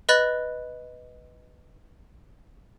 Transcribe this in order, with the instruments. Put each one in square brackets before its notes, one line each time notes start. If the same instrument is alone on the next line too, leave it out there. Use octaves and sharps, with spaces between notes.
[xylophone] B4 D#5 B5 F#6 A6